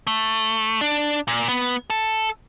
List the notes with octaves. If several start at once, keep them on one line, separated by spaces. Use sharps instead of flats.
A3
D4
A#2
B3
A4